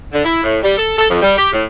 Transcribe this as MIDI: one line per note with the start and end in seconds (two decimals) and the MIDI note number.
0.12 0.24 50
0.25 0.40 64
0.44 0.58 45
0.63 0.75 55
0.78 0.94 69
0.98 1.07 69
1.10 1.21 41
1.22 1.33 55
1.37 1.50 67
1.53 1.63 45